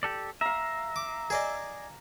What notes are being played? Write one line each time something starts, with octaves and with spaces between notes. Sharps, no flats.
G4 A4 D5
E5 F5 A#5
D6
G#4 D5 D#5